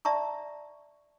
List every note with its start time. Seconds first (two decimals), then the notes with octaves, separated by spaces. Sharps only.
0.05 D5 E5 A5 A#5 C#6